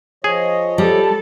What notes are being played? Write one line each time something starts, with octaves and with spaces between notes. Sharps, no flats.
F3 G#4 C#5 D#5
G3 A4 A5